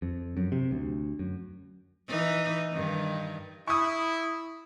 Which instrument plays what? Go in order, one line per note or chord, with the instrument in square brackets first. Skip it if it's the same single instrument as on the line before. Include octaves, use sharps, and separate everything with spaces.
[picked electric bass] F2
F#2
C3
D2
F#2
[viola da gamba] E3 D#4
G2 D#3
[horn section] E4 [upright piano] C#6 D#6